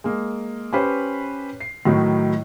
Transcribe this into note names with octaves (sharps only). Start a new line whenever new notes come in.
G#3 A#3
C#4 G4 B4 C5
C7
A2 D#3 F#3 D#4 E4